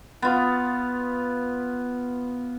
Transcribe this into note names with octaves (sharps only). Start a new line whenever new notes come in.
B3 F4